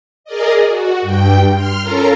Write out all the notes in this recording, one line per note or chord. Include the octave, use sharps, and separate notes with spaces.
G#4 A#4 D5 D#5
F#4
G2 G5
C6 F6
C#4 F4 A4 A#4 A#5